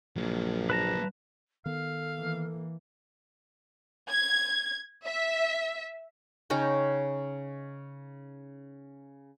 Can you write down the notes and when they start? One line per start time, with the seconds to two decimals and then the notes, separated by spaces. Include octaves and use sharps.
0.16 A#1 F#3 A#3
0.70 B4 A5 A#5
1.66 D#3 B3 A4 F5
2.17 E3 A#3
4.09 G#6
5.06 E5
6.50 C#3 C#4 D#4 G5